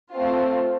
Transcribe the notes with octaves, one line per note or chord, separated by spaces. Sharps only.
A3 C4 F4